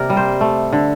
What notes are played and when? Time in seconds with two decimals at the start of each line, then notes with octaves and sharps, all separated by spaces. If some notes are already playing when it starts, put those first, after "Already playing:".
Already playing: C3 A#3 A#4 D5
0.10 G3
0.17 C5
0.41 A3
0.73 D3